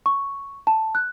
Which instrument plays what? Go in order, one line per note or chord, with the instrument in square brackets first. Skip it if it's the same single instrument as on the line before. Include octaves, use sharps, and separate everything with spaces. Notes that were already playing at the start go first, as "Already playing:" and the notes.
[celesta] C#6
A5
F#6